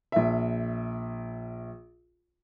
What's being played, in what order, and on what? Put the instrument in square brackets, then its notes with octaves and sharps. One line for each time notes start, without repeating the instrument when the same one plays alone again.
[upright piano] A#1 E5